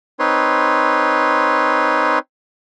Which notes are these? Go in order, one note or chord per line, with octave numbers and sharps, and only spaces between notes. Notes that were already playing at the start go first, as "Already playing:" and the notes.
C4 D#4 B4 C#5 C6